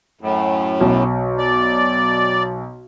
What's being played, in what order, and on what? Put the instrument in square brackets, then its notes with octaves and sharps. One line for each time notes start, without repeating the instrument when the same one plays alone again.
[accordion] F#2 A2
[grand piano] B1
[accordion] D5